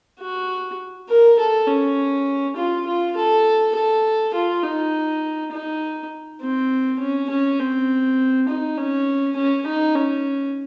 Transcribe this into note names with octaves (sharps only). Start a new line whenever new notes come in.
F#4
A#4
A4
C#4
F4
F4
A4
A4
F4
D#4
D#4
C4
C#4
C#4
C4
D#4
C#4
C#4
D#4
C#4